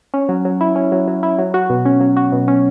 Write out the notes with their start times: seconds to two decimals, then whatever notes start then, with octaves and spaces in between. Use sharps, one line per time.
0.14 C#4
0.29 F#3
0.45 F#3
0.61 E4
0.75 C#4
0.92 F#3
1.08 F#3
1.23 E4
1.39 F#3
1.54 F#4
1.70 B2
1.85 C#4
2.01 F#3
2.17 F#4
2.32 B2
2.48 C#4